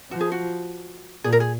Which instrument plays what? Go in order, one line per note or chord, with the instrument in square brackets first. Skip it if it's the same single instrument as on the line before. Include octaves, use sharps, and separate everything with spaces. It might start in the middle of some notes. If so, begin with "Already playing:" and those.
[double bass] F3 [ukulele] F#4
[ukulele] G#4
F#4
[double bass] A#2 [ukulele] G#4
[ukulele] A#4
G#4